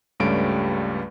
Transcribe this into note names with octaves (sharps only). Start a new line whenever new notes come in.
C#2 G2 G3 A3 C#4 D7